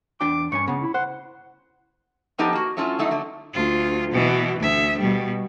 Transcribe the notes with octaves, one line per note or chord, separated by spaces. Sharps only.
E2 D4 G5 D6
G2 C#4 G#5 C#6
C#2 C#3 B3
E4
C5 F#5
F3 B3 D#4 G4 A4
A#3 F#4
F#3 A3 C#4 E4 F4
F#3 A3 D#4 E4
D3 F#3 A3
D2 F4
B2 E3
D2 E5
B2 G3